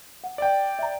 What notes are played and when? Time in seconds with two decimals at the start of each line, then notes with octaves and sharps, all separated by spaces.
0.24 F#5
0.38 D5 G5
0.79 E5 A#5